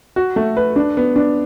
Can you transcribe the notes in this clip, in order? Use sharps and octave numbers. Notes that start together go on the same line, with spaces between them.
F#4
A3
B4
D4
B3
D4